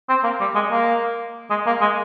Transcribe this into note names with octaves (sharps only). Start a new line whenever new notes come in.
C4
A#3
G3
G#3
A#3
G#3
A#3
G#3